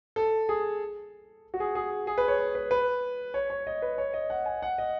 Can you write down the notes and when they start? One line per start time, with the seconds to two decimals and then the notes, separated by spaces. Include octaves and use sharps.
0.16 A4
0.49 G#4
1.54 F#4
1.60 G#4
1.75 G#4
2.07 G#4
2.18 B4
2.28 C#5
2.39 C#5
2.55 B4
2.71 B4
3.34 C#5
3.50 C#5
3.67 D#5
3.82 B4
3.98 C#5
4.14 D#5
4.30 F#5
4.46 G#5
4.62 F#5
4.78 D#5